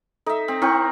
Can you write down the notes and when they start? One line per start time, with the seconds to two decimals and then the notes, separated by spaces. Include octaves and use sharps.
0.26 D#4 A4 E5
0.48 C4
0.62 C4 E4 A#4 G5 C#6 G6